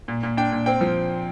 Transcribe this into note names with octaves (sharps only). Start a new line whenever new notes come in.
A#2
A#2
D4 G5
A#2
C4 G5
F3